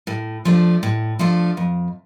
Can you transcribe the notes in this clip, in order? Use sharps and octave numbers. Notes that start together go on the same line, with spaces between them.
A2
F3 A3 D4 F4
A2
F3 A3 D4 F4
F2